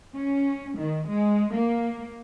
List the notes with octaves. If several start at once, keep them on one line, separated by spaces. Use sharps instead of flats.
C#4
D#3
G#3
A#3